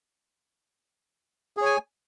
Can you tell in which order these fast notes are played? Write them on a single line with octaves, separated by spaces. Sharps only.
G#4 C#5 G#5